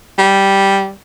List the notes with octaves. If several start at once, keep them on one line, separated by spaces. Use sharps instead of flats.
G3